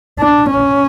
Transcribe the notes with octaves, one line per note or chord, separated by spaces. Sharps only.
D4
C#4